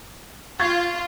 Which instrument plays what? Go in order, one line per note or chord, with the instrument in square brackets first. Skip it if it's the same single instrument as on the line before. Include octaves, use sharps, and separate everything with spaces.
[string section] F4 [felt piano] C#6 G#6 A6